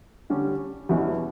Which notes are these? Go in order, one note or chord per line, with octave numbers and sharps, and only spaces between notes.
D3 G3 C#4 G4
E2 B2 G3 C#4 E4